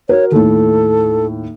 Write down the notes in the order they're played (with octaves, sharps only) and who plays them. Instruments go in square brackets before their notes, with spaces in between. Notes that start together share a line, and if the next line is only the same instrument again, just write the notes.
[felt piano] F#4 A#4 [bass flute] C#5
[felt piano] D#2 A2 [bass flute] A4